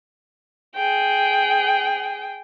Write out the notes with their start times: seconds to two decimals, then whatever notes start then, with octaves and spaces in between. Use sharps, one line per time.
0.75 G#4 G5